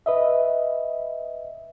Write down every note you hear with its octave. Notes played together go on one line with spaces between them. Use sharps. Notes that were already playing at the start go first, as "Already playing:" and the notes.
B4 D#5 E5